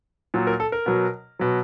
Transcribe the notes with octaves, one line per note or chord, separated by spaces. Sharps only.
A#2 F#3
A#4
A4
A#4
B2 F#3
B2 F#3